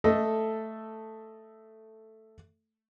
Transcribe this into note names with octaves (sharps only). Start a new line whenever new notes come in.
A3 A4 D#5